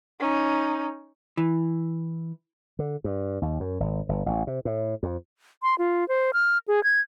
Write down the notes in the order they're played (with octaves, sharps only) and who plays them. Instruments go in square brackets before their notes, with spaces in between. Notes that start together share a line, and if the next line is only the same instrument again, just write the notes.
[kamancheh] C#4 D#4
[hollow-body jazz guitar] E3
[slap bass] D3
G2
D#2
F#2
G#1
G1
A1
C3
A2
F2
[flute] C6
F4
C5
F6
G#4
G#6